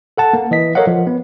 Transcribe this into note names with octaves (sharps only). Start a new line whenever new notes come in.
A4 F#5 A5
A#3
E3 D#5 B6
A4 A#4 C#5 D#5 F5 F#5
F3
B3